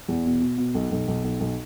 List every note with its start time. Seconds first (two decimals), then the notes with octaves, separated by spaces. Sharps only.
0.09 E2
0.25 B2
0.41 B2
0.58 B2
0.75 B1
0.91 B1
1.08 B1
1.24 B1
1.40 B1